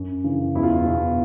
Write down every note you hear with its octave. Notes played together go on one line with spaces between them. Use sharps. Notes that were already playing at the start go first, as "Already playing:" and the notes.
Already playing: F#2
C#3 E3
E2 E4
F4
E4
B2